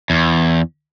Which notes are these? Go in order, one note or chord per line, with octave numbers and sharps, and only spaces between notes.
E2